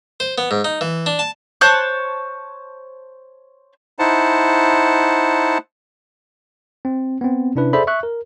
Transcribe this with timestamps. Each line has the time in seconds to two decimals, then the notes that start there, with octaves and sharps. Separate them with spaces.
0.20 C5
0.38 B3
0.51 G#2
0.65 D#4
0.81 E3
1.06 D4
1.19 A5
1.61 C5 C#5 A5 F#6
3.99 D#4 E4 C5 F#5 A5
6.85 C4
7.21 B3 C4
7.55 C3 C#4 D4 E4 B4
7.73 G#4 A4 C5 D5 E5 B5
7.87 E5 C#6 F#6
8.03 A#4